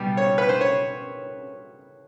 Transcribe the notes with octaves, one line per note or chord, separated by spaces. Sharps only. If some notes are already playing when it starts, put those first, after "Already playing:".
Already playing: B2 G3
C#5
B4
C5
C#5